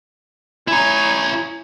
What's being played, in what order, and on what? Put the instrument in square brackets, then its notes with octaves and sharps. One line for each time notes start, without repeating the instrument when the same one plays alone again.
[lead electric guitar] E4 A#5 [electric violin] C#5 G#5